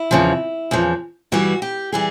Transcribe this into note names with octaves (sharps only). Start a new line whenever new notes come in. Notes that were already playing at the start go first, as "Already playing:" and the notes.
Already playing: E4
E2 C#3 F3
E2 C#3 F3
G2 E3 G3 F#4
G4
E3 G3 G#4